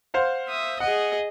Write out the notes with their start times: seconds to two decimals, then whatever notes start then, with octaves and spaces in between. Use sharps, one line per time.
0.14 C5 F5 F#5
0.48 E5 D#6
0.80 G#4 D#5 F#5